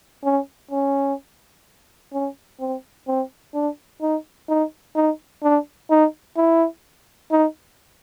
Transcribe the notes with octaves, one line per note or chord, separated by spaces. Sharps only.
C#4
C#4
C#4
C4
C4
D4
D#4
D#4
D#4
D4
D#4
E4
D#4